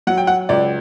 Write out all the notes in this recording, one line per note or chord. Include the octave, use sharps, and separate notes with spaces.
F#3 F#5
G5
F#5
C#2 D5